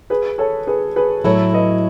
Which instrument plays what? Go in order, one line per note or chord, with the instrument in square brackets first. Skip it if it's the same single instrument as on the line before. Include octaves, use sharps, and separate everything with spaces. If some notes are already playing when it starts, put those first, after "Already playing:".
[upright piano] G#4 B4
A4 C#5
G#4 B4
G#4 B4
[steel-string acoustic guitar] A2 F#3 A3 E4 [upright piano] A4 C#5
[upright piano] B4 D#5